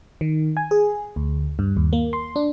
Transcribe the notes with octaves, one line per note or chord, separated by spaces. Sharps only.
D#3
G#5
G#4
D2
G2
D#2
A#3
C6
D4